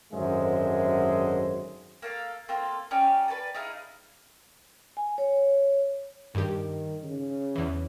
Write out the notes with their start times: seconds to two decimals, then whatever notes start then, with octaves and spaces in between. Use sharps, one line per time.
0.13 G#1 F#2 D3 G#3 C5 E5
2.02 A#3 A4 F5
2.49 A#3 C4 F4 A4
2.91 C#4 D#4 G4 D5
3.28 B4 D5 G5 A5
3.54 D#4 E4 G#4 F5
4.97 G#5
5.18 C#5
6.35 G2 D#3 G4
7.03 C#3
7.55 E2 E3